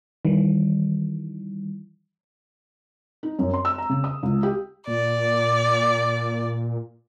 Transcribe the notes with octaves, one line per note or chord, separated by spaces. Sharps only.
D#3 E3 G3
D#4
F#2
C6
E6
A#5
C#3
D#6
C#2
G4
A#2 D5